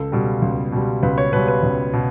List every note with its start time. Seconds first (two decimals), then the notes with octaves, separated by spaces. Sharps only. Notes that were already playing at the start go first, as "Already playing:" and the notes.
Already playing: C#2 A4
0.12 B2 G3
0.42 C#2
0.72 B2 G3
1.03 C#2 B4
1.18 C#5
1.33 B2 G3 B4
1.48 B4
1.63 C#2
1.93 B2